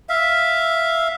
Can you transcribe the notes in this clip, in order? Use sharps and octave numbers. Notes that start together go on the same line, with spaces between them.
E5 F5